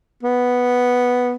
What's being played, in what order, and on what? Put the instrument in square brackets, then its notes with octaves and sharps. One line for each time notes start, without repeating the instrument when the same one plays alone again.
[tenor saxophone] B3